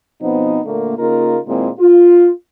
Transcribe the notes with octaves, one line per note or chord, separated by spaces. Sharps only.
B2 F3 B3 C4 D#4
A#2 D3 A3 A#3
C#3 A#3 D#4 F4 A#4
A#2 D#3 G#3 C4 E4 G#4
F4